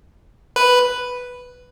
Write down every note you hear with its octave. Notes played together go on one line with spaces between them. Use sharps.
B4